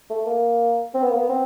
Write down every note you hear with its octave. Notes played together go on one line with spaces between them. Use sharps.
A3
A#3
C4
B3
A#3
B3
C4